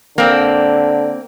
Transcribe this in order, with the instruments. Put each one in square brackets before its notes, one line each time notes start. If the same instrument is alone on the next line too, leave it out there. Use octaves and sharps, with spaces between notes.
[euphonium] D3 [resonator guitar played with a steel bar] A#3 C4